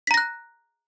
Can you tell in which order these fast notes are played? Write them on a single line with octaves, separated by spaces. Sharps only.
B6 A#5 A#6 F#6